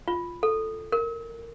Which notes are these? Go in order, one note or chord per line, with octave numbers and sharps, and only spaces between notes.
F4
A4
A#4